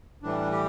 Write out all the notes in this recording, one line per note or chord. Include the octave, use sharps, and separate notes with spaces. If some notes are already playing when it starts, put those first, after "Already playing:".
A2 E3 G3 D4
G4